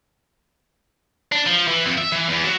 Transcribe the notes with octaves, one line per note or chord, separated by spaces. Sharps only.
D4
F3
E3
F2
E5
E3
E2
F#3